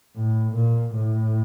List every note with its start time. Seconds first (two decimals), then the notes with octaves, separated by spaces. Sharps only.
0.16 A2
0.55 A#2
0.95 A2